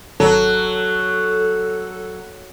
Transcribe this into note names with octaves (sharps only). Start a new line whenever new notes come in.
G#1 F#3 A4